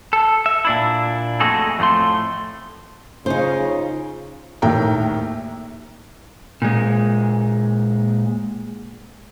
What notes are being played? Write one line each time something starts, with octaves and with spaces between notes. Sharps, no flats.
A4
E5
A#2 D4 E4
F2 G#3 A3 F#4 G#4 A4
F2 A2 A3 C6
C#3 D#4 F4 C5
A#1 D#2 A2 D#3 G5 A#5
A#2 G#3